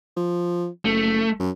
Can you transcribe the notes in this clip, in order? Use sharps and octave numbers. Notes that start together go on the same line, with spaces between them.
F3
F#1 A3
F#2